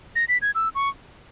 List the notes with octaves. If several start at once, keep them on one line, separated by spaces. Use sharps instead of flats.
A#6
B6
G#6
E6
C#6